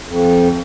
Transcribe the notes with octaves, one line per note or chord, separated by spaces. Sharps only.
F2